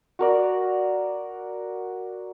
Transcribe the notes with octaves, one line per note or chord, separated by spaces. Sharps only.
F#4 A#4 D5